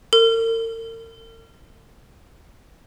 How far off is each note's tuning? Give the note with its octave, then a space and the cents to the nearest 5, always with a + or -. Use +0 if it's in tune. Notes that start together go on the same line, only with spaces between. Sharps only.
A#4 -45